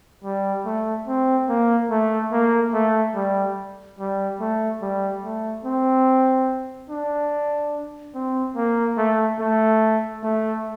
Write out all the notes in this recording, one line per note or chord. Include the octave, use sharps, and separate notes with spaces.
G3
A3
C4
A#3
A3
A#3
A3
G3
G3
A3
G3
A3
C4
D4
C4
A#3
A3
A3
A3